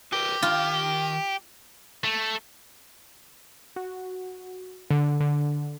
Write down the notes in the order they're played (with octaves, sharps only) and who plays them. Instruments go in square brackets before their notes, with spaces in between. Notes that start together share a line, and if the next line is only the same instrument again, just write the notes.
[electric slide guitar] F#4 A#4 B4 [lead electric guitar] G4
[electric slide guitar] D#3 G5 [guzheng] F4
[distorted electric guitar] A3
[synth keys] F#4
D3
D3